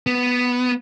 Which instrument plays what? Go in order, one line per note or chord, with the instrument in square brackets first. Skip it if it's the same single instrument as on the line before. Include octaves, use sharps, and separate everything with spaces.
[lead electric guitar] B3